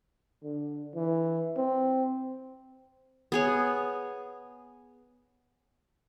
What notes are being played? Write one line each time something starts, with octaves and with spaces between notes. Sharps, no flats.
D3
E3
C4
B3 G#4 C#5